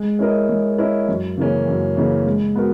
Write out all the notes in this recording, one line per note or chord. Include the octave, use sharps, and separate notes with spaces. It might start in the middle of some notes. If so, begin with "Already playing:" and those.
Already playing: G#3
C#4 E4 A#4 D#5
G#3
C#4 E4 A#4 D#5
F#2
C#3 E3 A#3 C#4
F#2
C#3 E3 A#3 C#4
G#3
B3 F#4 A#4